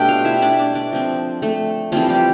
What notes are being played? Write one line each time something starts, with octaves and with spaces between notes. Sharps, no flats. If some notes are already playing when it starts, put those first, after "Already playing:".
Already playing: B2 A3 D4 G4 G5
F4 F5
E4 E5
D4 D5
D4 D5
D4 D5
F3 C4
A3 A4
E3 F3 G3 C4 F4
G3 G4